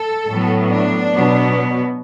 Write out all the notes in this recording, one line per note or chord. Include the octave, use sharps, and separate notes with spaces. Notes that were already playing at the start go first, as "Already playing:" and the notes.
Already playing: A4
A2 F#3 B3
D4
B2 F#3 B3